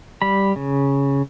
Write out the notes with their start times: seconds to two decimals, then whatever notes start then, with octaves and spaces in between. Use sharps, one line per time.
0.22 G3 B5
0.56 C#3